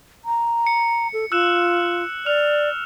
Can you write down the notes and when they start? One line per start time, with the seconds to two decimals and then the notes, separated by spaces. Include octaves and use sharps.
0.25 A#5
0.67 C#7
1.13 A4
1.32 F4 E6 F#6 E7
2.26 D5 F6 F7